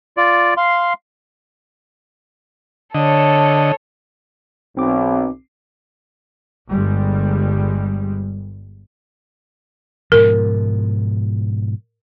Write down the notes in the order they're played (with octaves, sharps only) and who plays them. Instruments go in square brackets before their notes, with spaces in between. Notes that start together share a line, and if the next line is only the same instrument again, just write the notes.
[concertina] F4 D5
F5 C6
[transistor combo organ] D3 D#5 [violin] A4 C#5
[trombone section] B1 [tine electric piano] C4 D6
[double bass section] G1 G3 G#3
[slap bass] G#2 B2 F3 [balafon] A#4